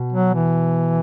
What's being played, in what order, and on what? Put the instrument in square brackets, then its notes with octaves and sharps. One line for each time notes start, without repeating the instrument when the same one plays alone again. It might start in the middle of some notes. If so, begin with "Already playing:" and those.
Already playing: [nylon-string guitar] B2
[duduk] F#3
E3